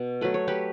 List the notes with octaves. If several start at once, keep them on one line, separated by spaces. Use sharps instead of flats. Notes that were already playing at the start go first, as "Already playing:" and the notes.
Already playing: B2
F#3 A3 B4
C#5
G4 B4